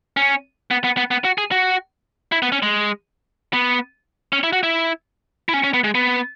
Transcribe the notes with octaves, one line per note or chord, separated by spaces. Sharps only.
C#4
B3
B3
B3
B3
F#4
G#4
F#4
E4
B3
C#4
G#3
B3
C#4
E4
F#4
E4
E4
C#4
C#4
B3
G#3
B3